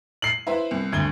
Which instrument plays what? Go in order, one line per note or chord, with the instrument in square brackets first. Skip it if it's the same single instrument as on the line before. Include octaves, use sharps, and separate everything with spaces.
[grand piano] C7 F#7
[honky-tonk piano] E4 B4 C5
C2
[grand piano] D2 G#6 G7